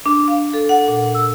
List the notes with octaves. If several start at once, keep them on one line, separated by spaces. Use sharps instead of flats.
D4
F5
A4
F#5
A#2
E6